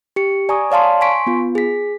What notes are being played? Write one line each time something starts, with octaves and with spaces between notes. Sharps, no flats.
G4 C#7
D5 G#5 A#5 C#6 D#6
C#5 D5 F5 A5 C6
G#5 C6 C#6 B6 D7
B3 F4
G#4 B6